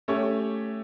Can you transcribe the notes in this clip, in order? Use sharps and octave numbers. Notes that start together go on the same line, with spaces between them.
A3 C#4 G4 C#5